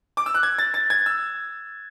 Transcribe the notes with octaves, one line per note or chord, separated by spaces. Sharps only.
D6
E6
F#6
G#6
A6
A6
G#6
E6